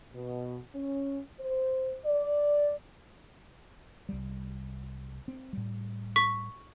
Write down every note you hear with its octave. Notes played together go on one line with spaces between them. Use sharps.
B2
C#4
C5
D5
C2 G3
C4
A2 G3
C#6 B6